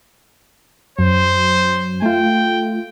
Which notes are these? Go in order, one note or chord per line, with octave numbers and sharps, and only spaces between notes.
F#2 F#3 C5
A3 F4 G5